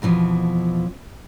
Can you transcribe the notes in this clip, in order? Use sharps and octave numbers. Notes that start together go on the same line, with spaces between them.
F2 B2 E3 F3